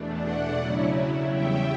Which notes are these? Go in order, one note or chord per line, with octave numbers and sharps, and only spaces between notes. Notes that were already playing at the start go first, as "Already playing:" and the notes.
Already playing: E2 B2 A3 D4
D5 F#5
C#3 F#3 C#4 E4
E2 C#3 G3 C#4 E5 G5